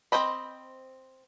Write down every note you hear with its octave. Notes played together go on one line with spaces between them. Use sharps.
C4 A#4 C5 D#5 B5